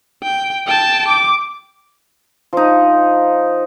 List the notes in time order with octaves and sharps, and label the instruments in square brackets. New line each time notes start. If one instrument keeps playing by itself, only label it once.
[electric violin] G5
G5 A5
D6
[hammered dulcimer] F3 D#4